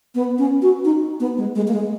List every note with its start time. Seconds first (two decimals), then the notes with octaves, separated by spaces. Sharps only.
0.15 B3
0.38 C#4
0.62 F#4
0.85 D#4
1.20 B3
1.38 G#3
1.56 G#3
1.68 A#3
1.74 G#3